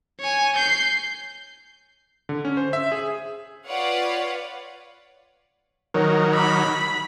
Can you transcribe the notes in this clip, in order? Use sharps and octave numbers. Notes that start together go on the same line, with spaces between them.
C#5 G#5
G6 C7
D3
C#4
C5
E5
G#4
F4 B4 C#5 D5 F5 F#5
D#3 F#3 A#4 C#5 A#5
B5 D6 E6